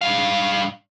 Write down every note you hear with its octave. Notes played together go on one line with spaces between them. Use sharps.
G2 F5